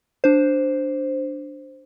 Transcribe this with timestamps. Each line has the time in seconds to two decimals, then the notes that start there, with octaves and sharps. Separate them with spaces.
0.24 D4 C5